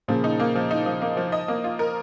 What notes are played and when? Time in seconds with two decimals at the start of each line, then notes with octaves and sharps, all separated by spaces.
0.08 A#2 C#3 F3
0.24 D#4
0.40 A#3
0.55 F3
0.71 D#4
0.86 F3
1.02 A#3
1.17 F3
1.32 D#5
1.48 A#3
1.64 F4
1.79 A#4